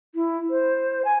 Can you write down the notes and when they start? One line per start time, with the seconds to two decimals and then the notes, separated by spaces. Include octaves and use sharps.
0.15 E4
0.50 C5
1.05 G#5